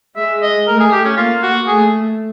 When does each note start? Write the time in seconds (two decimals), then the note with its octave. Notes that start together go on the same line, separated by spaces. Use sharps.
0.16 G#3 E5
0.42 D#5
0.67 A3 A#4
0.80 G#4
0.92 G4
1.05 C#4
1.17 A#3 F4
1.43 F#4
1.67 A3 G#4